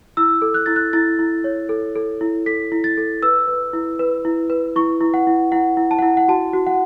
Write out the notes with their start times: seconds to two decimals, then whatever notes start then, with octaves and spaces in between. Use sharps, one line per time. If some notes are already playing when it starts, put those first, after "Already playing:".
0.17 E4 E6
0.42 A4
0.54 F#6
0.66 E4 A6
0.76 F#6
0.93 E4 A6
1.19 E4
1.44 C#5
1.69 A4
1.96 A4
2.21 E4
2.46 A4 B6
2.72 E4
2.84 A6
2.97 A4
3.22 B4 E6
3.48 B4
3.73 E4
3.99 B4
4.25 E4
4.50 B4
4.76 E4 C#6
5.01 E4
5.14 F#5
5.27 E4
5.52 E4 F#5
5.77 E4
5.91 A5
5.99 E4 F#5
6.17 F#5
6.28 F#4 A5
6.53 F#4
6.67 F#5